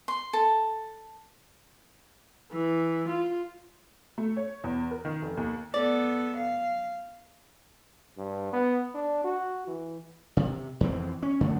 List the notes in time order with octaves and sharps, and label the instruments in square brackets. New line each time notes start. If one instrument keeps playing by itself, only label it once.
[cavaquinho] C6
A4
[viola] E3
F4
[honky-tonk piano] A3
C#5
E2
A#4
D#3
F1
D#2
[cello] B3 A4 [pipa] D5
[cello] F5
[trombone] G2
B3
D4
F#4
E3
[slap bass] C3
F2 E3 C4
C#4
F#2 D3 A3